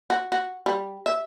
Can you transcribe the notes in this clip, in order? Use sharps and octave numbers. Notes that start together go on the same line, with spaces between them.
F#4
F#4
G3
E5